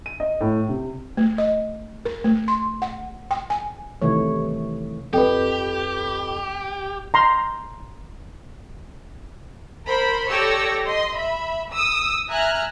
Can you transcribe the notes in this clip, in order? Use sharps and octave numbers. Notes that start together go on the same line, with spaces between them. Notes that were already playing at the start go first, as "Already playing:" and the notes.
D#7
D#5
A2
C3
A3
D#5
A#4
A3
C6
F#5
G5
G#5
C3 D#3 E3 A3 C#5
F2 G4 A4 B4 G5
A#5 C6
A#4 C5 B5
G4 A4 C#5 D5 E6 A#6
D#5 C6
E5 B5
D#6 E6
E5 G#5 A#5 F6 F#6